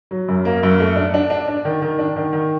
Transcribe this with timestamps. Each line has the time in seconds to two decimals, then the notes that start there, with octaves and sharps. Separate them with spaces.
0.11 F#3
0.28 F#2
0.45 A#3
0.63 F#2
0.80 A3
0.96 D4
1.14 D4
1.30 D4
1.48 D4
1.65 D#3
1.82 D#3
1.99 D4
2.16 D#3
2.33 D#3